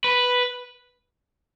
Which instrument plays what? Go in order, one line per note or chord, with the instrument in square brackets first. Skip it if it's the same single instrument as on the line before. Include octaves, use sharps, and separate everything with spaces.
[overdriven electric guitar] B4